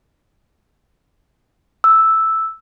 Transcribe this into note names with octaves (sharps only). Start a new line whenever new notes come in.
E6